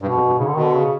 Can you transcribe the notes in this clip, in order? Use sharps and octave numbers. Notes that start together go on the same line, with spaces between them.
G2 B2
F2
G2
G#2 C#3
D3
B2 D#3
D3
C#3